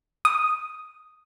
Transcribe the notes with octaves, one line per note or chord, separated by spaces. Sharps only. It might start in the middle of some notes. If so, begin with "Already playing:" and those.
D#6